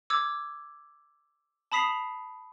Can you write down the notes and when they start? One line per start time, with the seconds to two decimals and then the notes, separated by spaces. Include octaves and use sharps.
0.10 D6 E6 G#6
1.72 A5 B5 D#6 B6 C7 F7